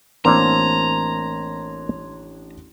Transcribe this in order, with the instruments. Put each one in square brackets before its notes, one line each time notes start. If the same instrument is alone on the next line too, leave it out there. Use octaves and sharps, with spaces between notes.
[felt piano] A1 D4 D5 [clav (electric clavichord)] A#3 C4 [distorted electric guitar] A#5 [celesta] C6 G#6